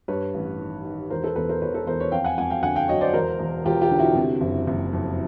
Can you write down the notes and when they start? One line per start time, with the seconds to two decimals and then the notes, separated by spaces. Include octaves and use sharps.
0.08 G2 B4 C#5
0.34 A1
0.59 D#3
0.85 D#3
1.10 E1 A#4 C5
1.24 A4 B4
1.36 E2 A4 B4
1.49 A#4 C5
1.61 E1 B4 C#5
1.74 A4 B4
1.87 E2 A#4 C5
2.00 B4 C#5
2.12 F2 F5 G5
2.24 F#5 G#5
2.38 F2 F#5 G#5
2.50 F5 G5
2.63 D3 F#5 G#5
2.76 F5 G5
2.88 F#3 C#5 D#5
3.01 C5 D5
3.14 E1 A#4 C5
3.39 E1
3.64 E1 F4 G4
3.81 F4 G4
3.91 D3
3.99 E4 F#4
4.15 C3
4.41 F#1
4.67 F#1
4.93 F2